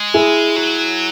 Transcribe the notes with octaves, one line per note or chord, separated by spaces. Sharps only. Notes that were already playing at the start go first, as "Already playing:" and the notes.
Already playing: G#3
E4 G#4
F#3